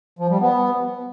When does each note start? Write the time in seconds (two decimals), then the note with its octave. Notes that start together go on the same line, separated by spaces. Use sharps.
0.19 F3
0.30 G3
0.40 B3